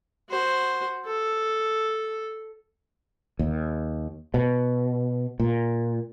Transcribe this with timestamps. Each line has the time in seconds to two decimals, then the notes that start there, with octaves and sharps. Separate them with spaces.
0.29 F#4 C5
1.06 A4
3.39 D#2
4.34 B2
5.40 A#2